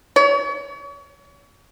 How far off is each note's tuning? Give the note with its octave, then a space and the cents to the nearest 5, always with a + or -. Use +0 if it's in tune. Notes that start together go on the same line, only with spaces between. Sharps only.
C#5 +40